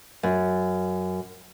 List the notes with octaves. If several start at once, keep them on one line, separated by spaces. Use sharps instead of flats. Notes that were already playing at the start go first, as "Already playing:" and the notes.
F#2